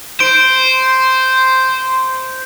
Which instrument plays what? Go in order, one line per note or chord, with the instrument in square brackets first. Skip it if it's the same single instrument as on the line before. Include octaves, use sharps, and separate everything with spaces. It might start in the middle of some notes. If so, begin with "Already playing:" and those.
[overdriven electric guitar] C5 [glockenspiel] D7